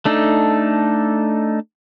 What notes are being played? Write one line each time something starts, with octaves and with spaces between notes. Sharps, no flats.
A3 D4 D#4 A4